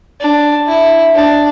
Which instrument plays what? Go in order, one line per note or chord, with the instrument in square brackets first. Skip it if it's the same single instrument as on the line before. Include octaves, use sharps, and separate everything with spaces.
[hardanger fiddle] D4
E4
D4